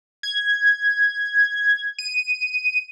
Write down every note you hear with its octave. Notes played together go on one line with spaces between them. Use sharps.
G#6
D#7